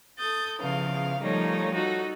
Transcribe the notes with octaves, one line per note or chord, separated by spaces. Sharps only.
A4 D#6 G6 A6
E2 C#3 F3 F5
A#2 F3 G3 A3 D#4 C#5
D#4 F#4 A4